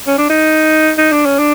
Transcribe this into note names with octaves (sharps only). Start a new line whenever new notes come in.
C#4
D4
D#4
D#4
D4
C#4
D4